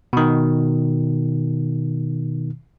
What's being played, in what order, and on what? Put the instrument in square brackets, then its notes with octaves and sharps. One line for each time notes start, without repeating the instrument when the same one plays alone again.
[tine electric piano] B2 D#3